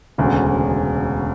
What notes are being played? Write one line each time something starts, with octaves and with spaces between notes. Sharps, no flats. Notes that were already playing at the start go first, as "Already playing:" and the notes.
E1 D2 C#3